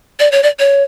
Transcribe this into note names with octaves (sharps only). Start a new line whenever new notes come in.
D5
C#5
D5
C#5